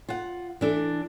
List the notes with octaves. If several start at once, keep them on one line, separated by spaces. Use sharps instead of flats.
F4 F#5
E3 D4 A4